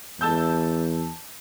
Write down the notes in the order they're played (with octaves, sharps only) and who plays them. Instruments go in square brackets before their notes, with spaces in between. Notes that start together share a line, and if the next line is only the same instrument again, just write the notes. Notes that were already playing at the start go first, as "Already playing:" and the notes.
[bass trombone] E2 [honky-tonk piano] A5 E6 G6